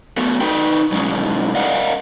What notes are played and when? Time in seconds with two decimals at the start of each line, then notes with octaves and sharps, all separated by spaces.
0.17 A3 B3 F#4 A4
0.41 D#4 B4 G5
0.92 B2 F#3 G#3 C#4 D#4 E4
1.55 A#4 D5 D#5 F5 F#5